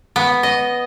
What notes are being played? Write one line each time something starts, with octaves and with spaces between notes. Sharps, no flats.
B3
D#5